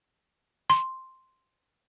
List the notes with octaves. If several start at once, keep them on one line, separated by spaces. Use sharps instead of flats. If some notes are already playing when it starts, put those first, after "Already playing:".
C6